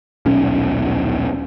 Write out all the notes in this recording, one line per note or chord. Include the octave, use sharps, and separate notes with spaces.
D#1 B1 C#4